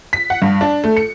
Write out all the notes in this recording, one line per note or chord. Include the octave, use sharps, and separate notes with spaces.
B6
F#5
G2
D4
A3
C#7